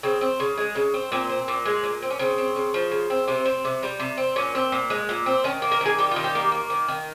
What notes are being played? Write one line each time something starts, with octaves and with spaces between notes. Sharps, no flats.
C#3 C4
C4
C#3
G#3
C#3
C4
A#2 C4
C4
A#2
G#3
A#2
C4
C#4
C#3 C4
C4
C#3
F3
C#3
C4
C3 C4
C4
C3
G3
C3
C4
A#2 C#4
C4
A#2
G#3
A#2
C4
D#3 C#4
A#3
A#4
D#3 G#4
G3 G4
D#3 F4
G4
A#3
A#3
D#3
D#3